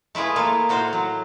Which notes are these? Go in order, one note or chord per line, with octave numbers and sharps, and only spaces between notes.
A3 E4 F4 G#4 B4
A#3 F4 A4
A2 F#4 C5 F5
F#3